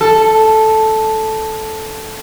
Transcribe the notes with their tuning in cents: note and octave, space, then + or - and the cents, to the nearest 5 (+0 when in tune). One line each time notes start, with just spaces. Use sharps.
A4 -5